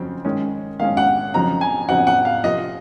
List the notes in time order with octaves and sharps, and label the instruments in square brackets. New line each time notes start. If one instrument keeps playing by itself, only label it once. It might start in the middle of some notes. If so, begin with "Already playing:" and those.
Already playing: [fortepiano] F2 C#3 F#3 C4
D#3 G#3 C#4
[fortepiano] D#3 G#3 C#4 [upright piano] F5
[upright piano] F#5
[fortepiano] F2 C#3 F#3 C4 D#4 [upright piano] A#5
[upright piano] G#5
[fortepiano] F2 C#3 F#3 C4 D#4 [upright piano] F#5
[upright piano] F#5
F5
[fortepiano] C3 F3 A#3 [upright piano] D#5